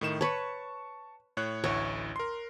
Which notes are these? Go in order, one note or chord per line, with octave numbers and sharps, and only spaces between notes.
A2 D#3 E7
B4 C#5 A5 C#6
A2 C#5 F#6
A1 D2 E4 C#5
A#4 C6